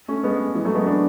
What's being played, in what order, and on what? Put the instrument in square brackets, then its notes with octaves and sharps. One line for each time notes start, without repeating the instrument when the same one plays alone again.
[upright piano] A3 C#4
G#3 B3
E3 G#3
F#3 A3
G#3 B3
B3 D4